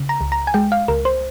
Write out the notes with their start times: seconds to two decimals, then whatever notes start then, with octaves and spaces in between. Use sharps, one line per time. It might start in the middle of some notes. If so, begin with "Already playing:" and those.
Already playing: C#3
0.09 A#5
0.21 C#2
0.32 A#5
0.47 G#5
0.54 G#3 G5
0.72 F5
0.88 C#2 A#4
1.05 C5